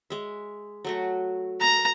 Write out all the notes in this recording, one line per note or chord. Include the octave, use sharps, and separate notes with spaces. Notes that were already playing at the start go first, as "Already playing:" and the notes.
G#3 E5
F#3 A3 F#4
A5 A#5